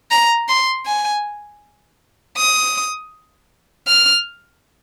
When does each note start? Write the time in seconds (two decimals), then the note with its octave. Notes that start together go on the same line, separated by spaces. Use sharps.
0.11 A#5
0.48 C6
0.86 G#5
2.37 D#6
3.87 F6